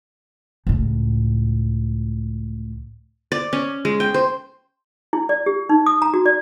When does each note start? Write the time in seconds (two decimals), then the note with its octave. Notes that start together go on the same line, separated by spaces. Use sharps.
0.67 C#2 A2
3.32 D5
3.53 C#4
3.85 G#3
4.00 G5
4.14 C5
5.13 E4
5.29 D5
5.46 G4
5.69 D#4
5.86 D#6
6.02 A#5
6.14 F#4
6.26 D5